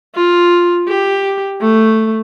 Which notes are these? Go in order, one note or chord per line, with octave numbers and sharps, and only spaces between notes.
F4
G4
A3